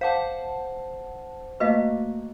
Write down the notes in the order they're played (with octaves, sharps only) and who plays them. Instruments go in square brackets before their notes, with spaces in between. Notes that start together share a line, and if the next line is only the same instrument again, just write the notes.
[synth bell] C5 F#5 A5 [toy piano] F5 D6
[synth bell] A3 A#3 F#4 [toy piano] B4 D#5 F5